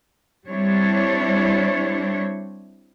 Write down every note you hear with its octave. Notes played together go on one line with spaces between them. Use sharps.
G3 C4 D4 E4 C#5